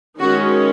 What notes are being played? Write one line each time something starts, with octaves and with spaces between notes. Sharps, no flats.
D#3 G#3 C#4 F#4